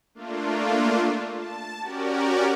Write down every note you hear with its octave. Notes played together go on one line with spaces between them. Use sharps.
A3 A#3 D4 F4
A5
C#4 F#4 G4 A#4 D5